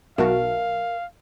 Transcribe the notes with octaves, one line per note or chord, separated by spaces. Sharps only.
B1 F#4 A#4 E5 F5 A5